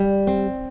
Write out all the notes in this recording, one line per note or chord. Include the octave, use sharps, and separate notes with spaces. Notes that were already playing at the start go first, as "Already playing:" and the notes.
Already playing: G3
C4